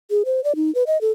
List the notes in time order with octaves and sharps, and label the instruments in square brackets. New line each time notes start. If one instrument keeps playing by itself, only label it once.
[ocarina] G#4
C5
D5
D#4
B4
D#5
A4